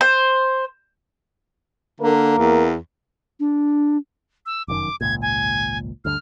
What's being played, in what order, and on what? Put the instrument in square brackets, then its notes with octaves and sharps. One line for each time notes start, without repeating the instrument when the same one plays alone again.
[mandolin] C5
[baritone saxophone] D3 [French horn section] A#3 A#4
[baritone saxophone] E2
[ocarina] D4
[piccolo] E6
[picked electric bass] F1 F#2 D#3 [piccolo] D6
[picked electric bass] G#1 C#2 A#2 [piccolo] G#6
[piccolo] G#5
[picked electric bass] D2 G2 D3 [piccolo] F6